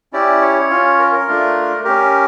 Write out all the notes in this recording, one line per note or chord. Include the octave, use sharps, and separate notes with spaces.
C#4 E4 G4 D5
C#5
C#4 F4
A#4
A#4
A3 D4 F4
C#4 G4 A#4